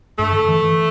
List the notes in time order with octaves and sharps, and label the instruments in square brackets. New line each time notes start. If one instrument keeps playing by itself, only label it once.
[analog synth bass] G2 [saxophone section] A3
[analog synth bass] D3
E3
E3